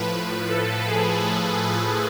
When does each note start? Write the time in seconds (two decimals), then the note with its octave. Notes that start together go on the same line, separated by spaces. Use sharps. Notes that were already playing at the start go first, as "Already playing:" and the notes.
Already playing: A2 F3 B4
0.49 A4
0.87 G#4
1.24 A4